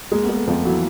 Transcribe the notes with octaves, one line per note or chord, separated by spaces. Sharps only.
G#3 A#3
B3
G#3
A3
F2 F3
E3 F#3